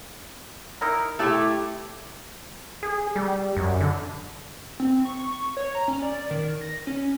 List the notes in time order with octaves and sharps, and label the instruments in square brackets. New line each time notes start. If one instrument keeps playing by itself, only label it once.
[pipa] D#4 E4 A#4
[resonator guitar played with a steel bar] A3 E4 G4 [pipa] A4
[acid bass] G#4
G3
F#2
D3
[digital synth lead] C4
C#6
C#5
A#5
C#4
D5
D#3
A#6
C#4